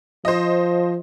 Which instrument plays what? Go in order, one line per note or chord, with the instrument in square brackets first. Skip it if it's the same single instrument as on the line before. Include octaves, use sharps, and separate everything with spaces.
[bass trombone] F3 [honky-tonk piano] C5 D#5